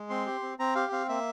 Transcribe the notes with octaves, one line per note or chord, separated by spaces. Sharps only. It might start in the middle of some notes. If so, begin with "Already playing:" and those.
Already playing: G#3
C4 C6
G4
C4
C4 A#5
G4 F5
C4 F5
A#3 E5